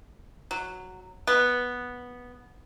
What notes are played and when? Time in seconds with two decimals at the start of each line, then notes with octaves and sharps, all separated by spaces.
0.51 F#3
1.27 B3